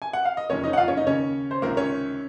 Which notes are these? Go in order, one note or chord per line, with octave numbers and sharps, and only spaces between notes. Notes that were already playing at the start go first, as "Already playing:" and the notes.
G#5
F#5
F5
D#5
F#1 F2 C3 D#3 C#4 C#5
D#4 D#5
F#5
F4 F5
C#4 C#5
D#4 D#5
D#2 C#3 C#4 C#5
C5
C#2 C3 D#3 A#3 A#4
C#4 C#5